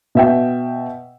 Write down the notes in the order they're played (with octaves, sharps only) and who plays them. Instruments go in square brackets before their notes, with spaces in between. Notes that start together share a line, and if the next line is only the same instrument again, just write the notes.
[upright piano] B2 E5 G5